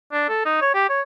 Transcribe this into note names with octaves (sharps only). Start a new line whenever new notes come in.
D4
A4
D#4
C#5
G4
C#5